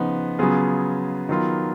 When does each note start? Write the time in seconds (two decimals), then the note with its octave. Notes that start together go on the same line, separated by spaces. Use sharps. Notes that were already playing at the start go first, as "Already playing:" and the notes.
Already playing: C#3 F3 B3 D#4 F#5
0.39 C#3 F#3 B3 F4 G#4
1.29 D#3 F#3 B3 F4